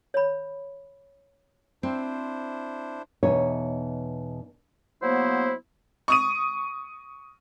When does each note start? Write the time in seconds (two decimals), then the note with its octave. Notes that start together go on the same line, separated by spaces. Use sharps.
0.14 C#5 B5
1.83 C4 D4 E4 C5
3.23 E2 B2 D#4 C#5 E5
5.02 F#3 A#3 B3 E4 C5
6.08 C#6 D#6 D#7